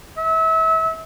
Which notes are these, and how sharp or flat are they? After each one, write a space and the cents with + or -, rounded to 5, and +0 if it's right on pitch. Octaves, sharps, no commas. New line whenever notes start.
E5 -30